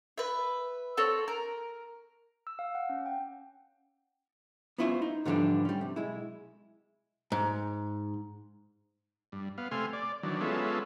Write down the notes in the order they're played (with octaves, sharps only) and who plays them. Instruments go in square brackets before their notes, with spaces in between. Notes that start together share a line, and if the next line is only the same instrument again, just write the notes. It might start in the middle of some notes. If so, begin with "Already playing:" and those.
[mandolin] B4 E5
C4 A4 C#5
A#4
[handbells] E6
F5
F#5
C#4
G5
[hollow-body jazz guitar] B3 C#4 E4 F4 C5 E5
D#4
G#2 D3 E3 F3 G3 D4
G3 C#4
C3
B1 G#3 E4
G#2
[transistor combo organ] G2
B3 F5
C3 A3 G#5 C6 F6
D5
D#3 E3 F#3 D4
G#3 B3 C#4 F4 A4 E5